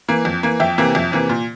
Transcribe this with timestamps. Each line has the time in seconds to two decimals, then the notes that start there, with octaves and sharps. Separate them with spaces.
0.08 E3 A#3
0.25 F2
0.43 E3 A#3
0.60 F2 E5 G5
0.78 C3 E3 A#3
0.95 F2
1.12 C3 E3 A#3
1.29 A#2